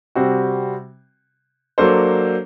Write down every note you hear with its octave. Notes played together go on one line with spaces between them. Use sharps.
C3 G3 C4 F#4
F#3 A#3 D4 A4 C5